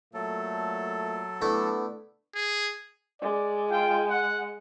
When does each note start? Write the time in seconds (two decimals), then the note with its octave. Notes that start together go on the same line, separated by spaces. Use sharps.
0.14 A#2 F#3 A3 A4
1.42 A3 B3 D4 E4
2.35 G#4
3.22 G#3 D5
3.70 F4 G5
4.10 F#5